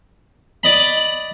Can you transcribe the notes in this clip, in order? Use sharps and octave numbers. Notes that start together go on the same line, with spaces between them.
D5 D#5 B5